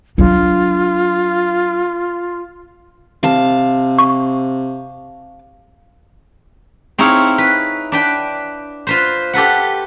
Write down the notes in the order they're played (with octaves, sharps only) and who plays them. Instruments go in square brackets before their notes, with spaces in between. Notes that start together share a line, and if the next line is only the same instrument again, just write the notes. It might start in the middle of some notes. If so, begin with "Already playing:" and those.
[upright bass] F#3 D4 [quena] F4
[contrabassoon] C3 [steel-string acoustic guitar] F5 A5
[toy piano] C#6
[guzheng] C4 D#4 E4 G#4 C#5 F5
B4
D4 B4 G5
F4 B4 C5
G4 A4 B4 F#5